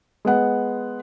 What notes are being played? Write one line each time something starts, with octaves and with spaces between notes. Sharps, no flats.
G#3 B3 F#5